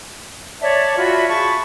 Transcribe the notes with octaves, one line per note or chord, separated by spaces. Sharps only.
C#5 D5 E5 A5
F4 F#4 E5 B5
G#4 A5 B5 C#6